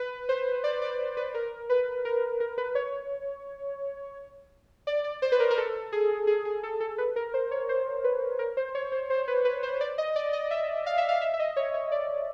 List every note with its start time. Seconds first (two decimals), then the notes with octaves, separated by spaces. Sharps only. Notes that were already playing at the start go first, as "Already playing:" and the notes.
Already playing: B4
0.29 C5
0.64 D5
0.82 D5
1.17 B4
1.34 A#4
1.69 B4
2.05 A#4
2.40 A#4
2.58 B4
2.75 C#5
4.87 D5
5.04 D5
5.22 C5
5.32 B4
5.40 A#4
5.51 A#4
5.58 A4
5.92 G#4
6.27 G#4
6.45 G#4
6.63 A4
6.80 A4
6.98 B4
7.16 A#4
7.34 C5
7.51 C#5
7.69 C5
8.04 B4
8.39 A#4
8.57 C5
8.75 C#5
8.92 C5
9.10 C5
9.28 B4
9.45 B4
9.63 C5
9.81 D5
9.98 D#5
10.16 D5
10.33 D#5
10.51 E5
10.86 F5
10.98 E5
11.09 F5
11.22 E5
11.34 E5
11.39 D#5
11.56 C#5
11.74 C#5
11.92 D5